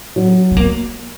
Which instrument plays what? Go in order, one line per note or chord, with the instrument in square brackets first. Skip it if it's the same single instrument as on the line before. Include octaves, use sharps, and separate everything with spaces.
[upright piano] F#3
[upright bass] C4
A#3